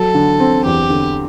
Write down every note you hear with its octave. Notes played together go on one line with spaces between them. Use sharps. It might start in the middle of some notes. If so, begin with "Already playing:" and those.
Already playing: F#3 A4
D3
C4
E2 G4
D3